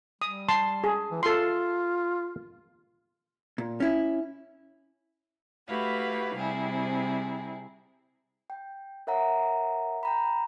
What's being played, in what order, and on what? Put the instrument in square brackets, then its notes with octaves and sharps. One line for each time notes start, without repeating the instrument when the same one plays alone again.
[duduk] G3 [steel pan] D#6
[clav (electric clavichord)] A5 [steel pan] C6
[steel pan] G#4
[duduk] E3
[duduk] F4 [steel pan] A4 C6
[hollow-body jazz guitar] A#2
C#4 E4
[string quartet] A3 E4 F#4 G4 B4 F5
C3 G3 C4 E4 G#4
[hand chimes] G5
A#4 C#5 E5 F#5 A#5
G5 A#5 B5